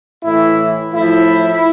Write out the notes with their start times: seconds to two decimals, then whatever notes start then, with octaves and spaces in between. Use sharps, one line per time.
0.23 A2 E3 E4
0.93 A2 F3 E4